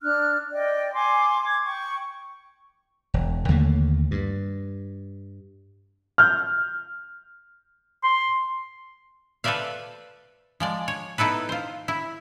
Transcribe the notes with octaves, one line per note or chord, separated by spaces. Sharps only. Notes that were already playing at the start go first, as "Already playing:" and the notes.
D4 F6 F#6
D5 D#5 G5
G#5 C6 D6
D6 G#6
G5 C#6
E1
D#2 D3 A3 A#3
G2
F6 G6
C6
A4 B4 C5 D5 E5 F5
F3 G#3 D5
C#5
B3 D#4 E4 A4 B4
F4 C5
E4